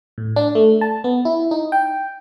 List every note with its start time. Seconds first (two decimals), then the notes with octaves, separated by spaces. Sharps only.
0.18 A2
0.36 D4
0.55 A3
0.81 A5
1.04 B3
1.25 E4
1.51 D#4
1.72 G5